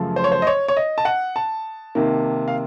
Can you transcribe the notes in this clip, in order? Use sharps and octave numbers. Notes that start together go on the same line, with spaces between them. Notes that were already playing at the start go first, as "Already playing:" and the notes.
Already playing: F#2 C#3 F3 A3
C5
C#5
C5
D#5
C#5
C#5
D#5
A5
F#5
A5
C3 D#3 A#3
F5